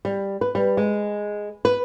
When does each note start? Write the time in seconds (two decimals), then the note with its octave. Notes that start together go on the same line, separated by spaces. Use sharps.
0.05 G3
0.41 B4
0.55 G3
0.77 G#3
1.65 B4